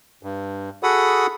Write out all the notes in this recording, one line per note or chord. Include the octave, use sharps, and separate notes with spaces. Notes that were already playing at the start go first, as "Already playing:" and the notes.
G2
F#4 G#4 A4 F#5 B5 D#6